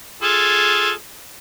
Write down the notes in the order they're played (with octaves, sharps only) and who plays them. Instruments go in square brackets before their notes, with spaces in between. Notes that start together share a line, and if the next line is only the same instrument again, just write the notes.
[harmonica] F4 G#4 A4